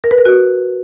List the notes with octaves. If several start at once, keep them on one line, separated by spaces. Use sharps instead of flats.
A#4
B4
A#4
F#4